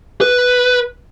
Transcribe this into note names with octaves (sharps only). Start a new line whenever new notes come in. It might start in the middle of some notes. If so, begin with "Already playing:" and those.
B4